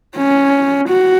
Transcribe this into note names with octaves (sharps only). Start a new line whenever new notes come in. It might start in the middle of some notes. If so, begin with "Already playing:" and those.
C#4
F#4